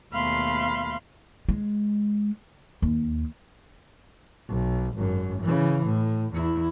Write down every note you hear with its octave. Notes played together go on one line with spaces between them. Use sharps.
D#2 B2 A3 F5 B5 C6
G#3
D#2
B1
G#1 F#2
C#3 E3
A2
E2 E4